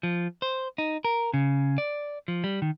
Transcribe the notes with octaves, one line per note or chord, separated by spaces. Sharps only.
F3
C5
D#4
A#4
C#3
D5
F3
G3
D#3